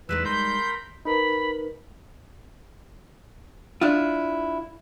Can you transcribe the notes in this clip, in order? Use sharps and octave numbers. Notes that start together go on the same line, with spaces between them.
E2 G3 G#3 D#4 B4 E6
A#4 B5 C6 G6
D#4 A#4 B4 B5
D4 E4 F4